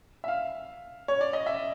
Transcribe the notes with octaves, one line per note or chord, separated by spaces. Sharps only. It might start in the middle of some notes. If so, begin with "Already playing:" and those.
E5
F5
C#5
D5
D#5
E5